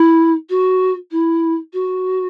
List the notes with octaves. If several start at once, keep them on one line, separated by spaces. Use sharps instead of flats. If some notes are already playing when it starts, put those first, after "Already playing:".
Already playing: E4
F#4
E4
F#4